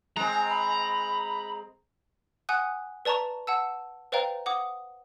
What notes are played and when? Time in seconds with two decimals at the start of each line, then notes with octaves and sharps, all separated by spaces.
0.17 G#3 C4 A#5
0.50 B5
2.49 F#5 G#5 D#6 F#6
3.05 B4 D5 A5 A#5 C#6
3.47 F#5 A5 E6
4.12 B4 C5 D5 F5 G5 A#5
4.46 F#5 D6 D#6